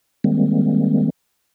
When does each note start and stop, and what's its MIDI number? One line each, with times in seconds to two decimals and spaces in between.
0.24 1.10 51
0.24 1.10 55
0.24 1.10 56
0.24 1.10 58
0.24 1.10 60